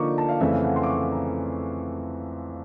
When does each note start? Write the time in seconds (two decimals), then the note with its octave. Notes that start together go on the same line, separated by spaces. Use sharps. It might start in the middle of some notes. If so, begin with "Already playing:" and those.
Already playing: D3 F3 A#3 D#4 C#6 D6
0.18 A5
0.29 F5
0.40 F2 C#3 E3 A3 E5
0.53 F5
0.64 F#5
0.76 C6
0.83 D6
0.88 C#6
1.11 A#5